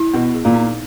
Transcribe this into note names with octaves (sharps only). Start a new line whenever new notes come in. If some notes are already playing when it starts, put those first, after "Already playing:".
Already playing: E4
B2 B3
G#4
A#2
D#4